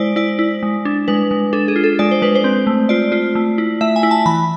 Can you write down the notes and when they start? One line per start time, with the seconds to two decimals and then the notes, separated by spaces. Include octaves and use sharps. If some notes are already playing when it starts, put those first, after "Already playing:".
Already playing: G#3 E4 C5 D5
0.16 E4 D5
0.39 E4
0.63 G#3
0.85 D4
1.08 G#3 B4
1.31 G#3
1.53 D4 A4
1.68 G#4
1.76 F4
1.84 A4
1.99 G#3 D5
2.11 C5
2.22 G#3 B4
2.35 C5
2.44 C4
2.67 A3
2.89 F4 D5
3.12 F4
3.35 A3
3.58 E4
3.81 A3 E5
3.96 G#5
4.03 E4
4.11 A5
4.26 E3 B5